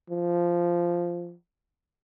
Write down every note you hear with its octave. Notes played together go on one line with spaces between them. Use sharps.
F3